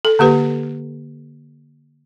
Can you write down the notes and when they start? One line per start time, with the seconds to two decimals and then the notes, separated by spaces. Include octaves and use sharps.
0.05 A4
0.19 D3 A#3 G4 B4